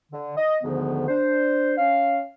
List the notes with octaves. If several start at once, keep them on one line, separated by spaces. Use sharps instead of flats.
D3
D#5
D2 G#2 D3 D#3 F3 B3
D4 C5
C#4 F5